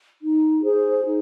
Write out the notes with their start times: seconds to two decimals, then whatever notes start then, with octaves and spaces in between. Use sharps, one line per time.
0.22 D#4
0.63 G#4 C5
1.04 D#4